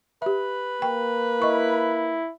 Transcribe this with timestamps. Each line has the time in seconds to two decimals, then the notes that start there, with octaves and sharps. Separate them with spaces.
0.22 G4 B4 E5
0.82 A#3 G5
1.42 E4 D#5 C#6